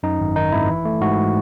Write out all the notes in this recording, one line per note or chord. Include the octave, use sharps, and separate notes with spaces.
F#2 D#4
G#1
D#3 D#4
G#1 E4
E3
A3
G#2 F#4